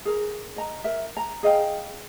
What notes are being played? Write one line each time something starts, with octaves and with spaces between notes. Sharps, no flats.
G#4 A#4
D#5 A#5
A#4 E5
A#5
G#4 D#5 F5 G5